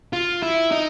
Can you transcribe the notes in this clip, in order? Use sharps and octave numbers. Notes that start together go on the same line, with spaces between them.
F4
E4
D#4